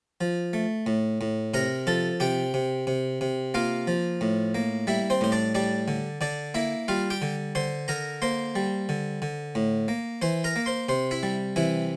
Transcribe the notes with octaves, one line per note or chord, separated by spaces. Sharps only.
F3
A3
A2
A2
C3 A#4 A#5
F3 A4 A5
C3 G4 G5
C3
C3
C3
A#3 F4 F5
F3
A2
A#3
G3 E4 E5
C4 C5
A2 C5
D4 D5
G3 D4 D5
D3
D3 D4 D5
A#3 E4 E5
G3 F4 F5
G4 G5
D3
D3 C5 C6
D3 A#4 A#5
A#3 C5 C6
G3
D3
D3
A2
A#3
E3 C5 C6
A#4 A#5
A#3
C5 C6
C3 C5 C6
E4 E5
G3
C3 E3 E4